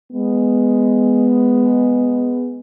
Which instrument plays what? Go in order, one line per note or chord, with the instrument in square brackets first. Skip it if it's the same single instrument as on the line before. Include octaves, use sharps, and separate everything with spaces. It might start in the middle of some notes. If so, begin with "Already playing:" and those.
[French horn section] G#3 B3